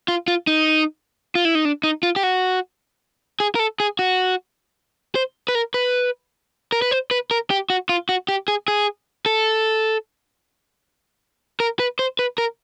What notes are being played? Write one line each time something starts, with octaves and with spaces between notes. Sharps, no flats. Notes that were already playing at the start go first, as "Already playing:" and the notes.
F4
F4
D#4
F4
E4
D#4
D4
D#4
F4
G4
F#4
G#4
A#4
A4
G#4
F#4
C5
B4
A#4
B4
A#4
B4
C5
B4
A#4
G4
F#4
F4
F#4
G4
G#4
G#4
A4
A#4
B4
C5
B4
A#4